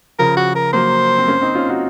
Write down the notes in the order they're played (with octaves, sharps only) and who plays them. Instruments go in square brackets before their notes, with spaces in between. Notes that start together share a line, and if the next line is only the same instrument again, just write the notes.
[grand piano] C#3 F3 [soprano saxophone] A#4
[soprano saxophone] F#4
A#4
[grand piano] F#3 A#3 [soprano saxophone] C5
[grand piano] C4
A#3 C#4
C4 D#4
C#4 F4
D#4 F#4